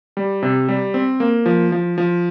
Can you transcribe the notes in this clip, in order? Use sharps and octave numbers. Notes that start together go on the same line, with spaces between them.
G3
C3
G3
C4
A#3
F3
F3
F3